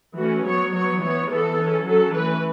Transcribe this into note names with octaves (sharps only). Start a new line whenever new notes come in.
E3 A3 C#4 F#4
F#3 B3 C#5
F#3 B3 C#5
E3 B3 C#5
E3 B3 A4
E3 C#4
F#3 C#4 A4
E3 A3 C#4 B4